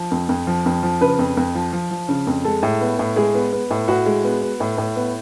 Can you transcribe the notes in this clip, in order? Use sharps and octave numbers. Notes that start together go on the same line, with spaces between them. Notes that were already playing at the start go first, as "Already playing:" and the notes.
Already playing: F3
F2
F2
F3
F2
F3
C#3 B4
F2
F2
F3
F3
F3
C#3
F2
G#3 A4
A2
B3
A2
G#3 G#4
B3
B3
A2
A2 F#4
G#3
B3
B3
A2
A2
B3